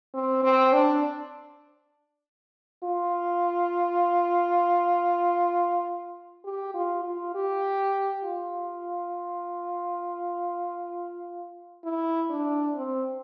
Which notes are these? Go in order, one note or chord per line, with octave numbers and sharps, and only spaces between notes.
C4
C4
D4
F4
G4
F4
F4
G4
F4
E4
D4
C4